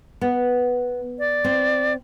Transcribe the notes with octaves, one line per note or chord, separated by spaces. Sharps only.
B3
D5
C4